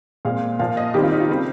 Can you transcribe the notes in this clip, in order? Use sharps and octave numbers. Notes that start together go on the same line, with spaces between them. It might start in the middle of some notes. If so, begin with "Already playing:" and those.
A#2 G#3 C4 F5
A#2 F3 A#3 F5
D#5
D#3 G3 C4 G4
F4
D#4
F4
C#3 G3 C4